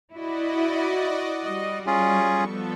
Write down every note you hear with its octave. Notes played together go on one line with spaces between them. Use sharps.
E4 F#4 D5 D#5
G3 D#5
C#4 F4 G#4 C#6
F3 B3 A4